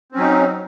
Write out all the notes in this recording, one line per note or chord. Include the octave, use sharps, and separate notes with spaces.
F#3 C4 C#4 D#4